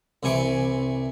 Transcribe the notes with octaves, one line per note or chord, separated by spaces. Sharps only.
C2 C3 E3 G#5 C#6 D6